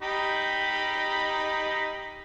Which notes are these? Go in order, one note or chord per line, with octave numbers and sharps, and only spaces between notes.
D#4 G4 B5